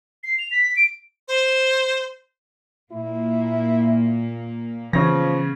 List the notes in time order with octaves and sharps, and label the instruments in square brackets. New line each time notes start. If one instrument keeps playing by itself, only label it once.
[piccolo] C7
F7
B6
D7
[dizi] C5
[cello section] A#2 A#3 [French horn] E4
[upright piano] C#3 C#4 A#6 [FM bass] E3 [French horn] F3 [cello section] B3